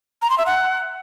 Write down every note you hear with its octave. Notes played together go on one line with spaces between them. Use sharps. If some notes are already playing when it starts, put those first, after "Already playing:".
A#5
C6
E5
F#5